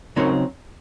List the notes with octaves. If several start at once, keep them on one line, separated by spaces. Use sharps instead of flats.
C#3 F#3 C4 D#4 A#4 C#5